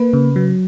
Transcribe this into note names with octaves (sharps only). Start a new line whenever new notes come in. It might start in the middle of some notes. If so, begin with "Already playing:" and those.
Already playing: A#3 B4
C#3
F#3